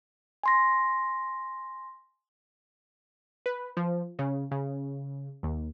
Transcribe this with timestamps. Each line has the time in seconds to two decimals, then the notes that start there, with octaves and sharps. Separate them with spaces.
0.43 G#5 C6 A#6
3.46 B4
3.77 F3
4.19 C#3
4.51 C#3
5.43 D#2